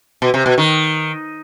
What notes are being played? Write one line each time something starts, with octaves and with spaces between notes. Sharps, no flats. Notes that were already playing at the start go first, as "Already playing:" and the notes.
B2
C3
B2
D#3